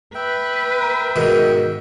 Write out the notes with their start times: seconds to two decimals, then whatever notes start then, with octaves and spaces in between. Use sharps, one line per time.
0.15 B4 E5 G5
1.16 G#2 B2 D#3